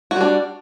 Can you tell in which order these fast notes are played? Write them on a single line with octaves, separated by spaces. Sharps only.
F#4 G3 D4